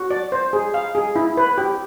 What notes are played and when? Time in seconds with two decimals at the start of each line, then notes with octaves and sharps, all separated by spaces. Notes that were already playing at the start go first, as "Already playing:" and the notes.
Already playing: F#4
0.11 D5
0.32 C5
0.53 G#4
0.74 F5
0.95 G#4
1.16 E4
1.37 B4
1.58 G4